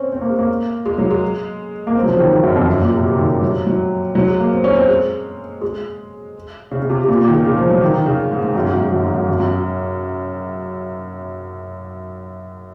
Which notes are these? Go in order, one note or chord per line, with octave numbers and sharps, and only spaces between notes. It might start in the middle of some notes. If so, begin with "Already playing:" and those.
Already playing: C4 C#4
C4
A#3
G#3
A#3
G#3
F#3
G#3
A#3
C4
F#3
F3
C#3
D#3
D#3
F#2
F2
F#2
A#2
C3
C#3
D#3
F#3
F#3
F#3
G#3
A#3
C4
C#4
C4
G#3
G#3
C#3
C#3
C3
C3
A#2
A#2
D#3
C#3
C#3
F3
F#3
D#3
D#3
C#3
G#2
G#2
F#2
G#2
F#2
G#2
F#2
G#2
F#2
F#2
F#2